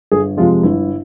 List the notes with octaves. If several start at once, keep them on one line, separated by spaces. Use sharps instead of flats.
G1 G#4
F2 C3 F3 G#3 F4
G1 E4